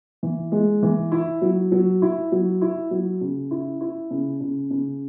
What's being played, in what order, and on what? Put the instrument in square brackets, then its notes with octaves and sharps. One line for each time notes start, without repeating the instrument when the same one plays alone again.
[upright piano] E3
G#3
E3
E4
F#3
F#3
E4
F#3
E4
F#3
C#3
E4
E4
C#3
C#3
C#3